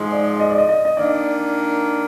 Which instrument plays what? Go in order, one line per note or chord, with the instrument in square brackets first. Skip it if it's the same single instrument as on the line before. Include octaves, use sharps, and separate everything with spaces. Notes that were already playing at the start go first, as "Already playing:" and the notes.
Already playing: [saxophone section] G#2 F3 G#3
[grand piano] D5
D#5
D5
D#5
D#5
D#5
[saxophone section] D#3 A#3 D4 [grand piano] D5